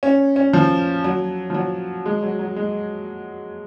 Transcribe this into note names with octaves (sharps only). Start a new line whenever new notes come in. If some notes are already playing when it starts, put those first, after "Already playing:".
C#4
C#4
F3
F#3
F3
F#3
G#3
F#3
F#3
G#3